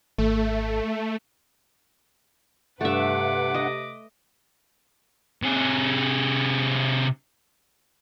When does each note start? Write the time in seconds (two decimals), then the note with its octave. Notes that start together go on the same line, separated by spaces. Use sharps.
0.18 G#1 A3
2.81 G2 C3 A3 B4 E5 F#5 D6
3.54 D#5
5.43 C3 G#4